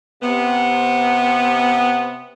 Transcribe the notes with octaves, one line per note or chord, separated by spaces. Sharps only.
C3 B3